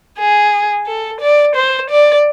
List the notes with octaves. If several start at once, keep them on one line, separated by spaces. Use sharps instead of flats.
G#4
A4
D5
C5
D5